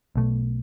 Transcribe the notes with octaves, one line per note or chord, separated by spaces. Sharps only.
B1 B2 A3